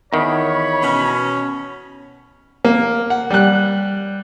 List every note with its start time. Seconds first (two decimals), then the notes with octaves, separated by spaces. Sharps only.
0.13 E2 D#3 C#5 B5
0.83 B2 C#4
2.65 A#3
3.10 F#5
3.30 G3 F#6